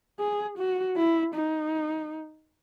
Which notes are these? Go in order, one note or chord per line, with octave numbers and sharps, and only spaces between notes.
G#4
F#4
E4
D#4